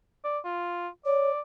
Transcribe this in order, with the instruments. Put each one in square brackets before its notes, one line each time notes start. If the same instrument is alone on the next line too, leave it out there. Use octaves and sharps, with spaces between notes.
[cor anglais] D5
F4
[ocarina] C#5 [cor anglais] D5